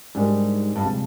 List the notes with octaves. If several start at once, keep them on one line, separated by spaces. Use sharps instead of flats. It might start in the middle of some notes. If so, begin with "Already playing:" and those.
G#2 G3 D4 G4 A#4
G2
C3 F3 G#3